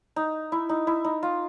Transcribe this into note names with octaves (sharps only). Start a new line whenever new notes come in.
D#4
E4
D#4
E4
D#4
F4